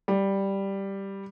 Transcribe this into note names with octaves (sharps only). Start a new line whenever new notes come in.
G3